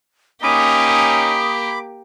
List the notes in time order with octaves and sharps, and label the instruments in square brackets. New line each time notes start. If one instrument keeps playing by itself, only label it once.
[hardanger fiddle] A#3 G4 [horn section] C#4 D#4 [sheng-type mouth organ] B5 D6 [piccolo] D#6